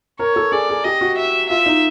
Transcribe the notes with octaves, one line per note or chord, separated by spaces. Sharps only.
A#4 C#5
A4
G#4 D5
G#4
G4 D#5
F#4
E5
F4 E5
D#4